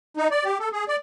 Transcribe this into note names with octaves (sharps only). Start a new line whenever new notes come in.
D#4
D5
G4
A4
G#4
D5